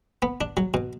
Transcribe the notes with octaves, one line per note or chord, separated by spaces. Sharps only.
B3
D4
F#3
B2